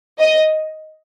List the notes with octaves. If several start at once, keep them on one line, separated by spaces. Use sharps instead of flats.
D#5